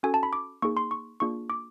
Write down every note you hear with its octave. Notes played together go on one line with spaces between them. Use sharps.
C#4 F#4 A4 G#5
A5
B5
D6
A#3 D#4 G#4 C#6
C6
C#6
A#3 D4 F4 G#4 C#6
D6